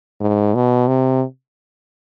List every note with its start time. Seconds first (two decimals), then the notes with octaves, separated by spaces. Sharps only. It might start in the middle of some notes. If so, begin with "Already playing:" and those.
0.21 G#2
0.55 B2
0.88 C3